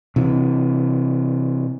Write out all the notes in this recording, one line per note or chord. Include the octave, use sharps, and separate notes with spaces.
C3 E3